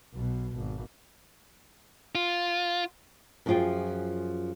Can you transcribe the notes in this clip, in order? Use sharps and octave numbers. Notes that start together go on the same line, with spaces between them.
B1 B2
G#1
F4
F#2 F3 G3 F4 G#4 G5